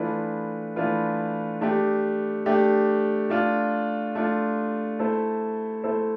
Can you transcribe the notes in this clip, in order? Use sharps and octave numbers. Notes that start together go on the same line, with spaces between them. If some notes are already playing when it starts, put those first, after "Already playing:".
Already playing: E3 A3 D4 F4 B4
E3 A3 D4 F4 B4
A3 D4 G4
A3 D4 G4
A3 D4 F4
A3 D4 F4
A3 E4 A4 C5
A3 E4 A4 C5